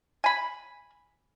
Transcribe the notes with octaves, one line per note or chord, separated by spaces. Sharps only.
G#5 B5